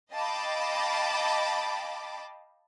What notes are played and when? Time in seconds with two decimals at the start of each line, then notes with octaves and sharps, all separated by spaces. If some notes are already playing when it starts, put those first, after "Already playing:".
0.13 D#5 F5 G5 A5 B5 D6